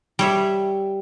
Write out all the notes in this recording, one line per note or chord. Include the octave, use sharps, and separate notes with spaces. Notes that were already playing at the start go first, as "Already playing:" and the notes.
G3 C#5 E5